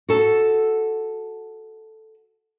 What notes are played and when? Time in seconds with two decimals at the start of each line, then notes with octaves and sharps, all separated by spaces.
0.09 F#4 A4